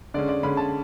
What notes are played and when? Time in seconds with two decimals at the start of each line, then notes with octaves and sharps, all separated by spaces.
0.14 D3 G#3 C#4 D5
0.29 D5
0.43 D3 G#3 C#4 B5
0.57 A5